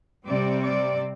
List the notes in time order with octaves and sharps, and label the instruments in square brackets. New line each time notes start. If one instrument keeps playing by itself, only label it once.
[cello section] C3 G3 C4 D5
D5